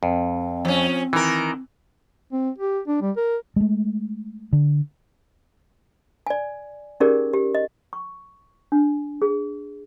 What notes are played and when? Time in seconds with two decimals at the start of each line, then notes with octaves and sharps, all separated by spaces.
0.03 F2 C4
0.65 F3 C#4
1.13 D#3 E3 A#4
2.32 C4
2.58 G4
2.87 D4
3.02 G3
3.17 A#4
3.56 G#3 A3
4.53 D3
6.27 D5 G#5
7.00 C#4 D#4 G4 G#4 A#4 D5
7.33 G4
7.55 D#5
7.93 C#6
8.72 D4
9.22 G#4